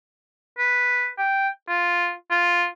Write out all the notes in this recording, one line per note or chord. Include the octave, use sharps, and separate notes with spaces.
B4
G5
F4
F4